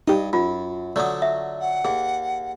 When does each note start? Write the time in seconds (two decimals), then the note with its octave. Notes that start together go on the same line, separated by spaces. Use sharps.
0.08 G2 D#4 G4 D#5
0.33 F#2 F4
0.96 D3 F#3 A3 D5 D#6
1.22 E5
1.60 F#5
1.85 D#2 G#4